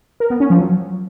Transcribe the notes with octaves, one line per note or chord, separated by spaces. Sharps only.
A#4
B3
C#4
F3
F#3